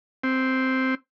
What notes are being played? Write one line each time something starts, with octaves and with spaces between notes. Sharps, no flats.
C4